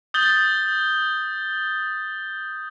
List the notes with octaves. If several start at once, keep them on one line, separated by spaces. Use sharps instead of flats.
D#6 G6 A6 G7